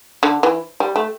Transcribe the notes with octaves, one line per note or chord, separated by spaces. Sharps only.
D3
E3
G3
A3